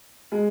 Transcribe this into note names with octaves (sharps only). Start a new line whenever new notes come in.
G#3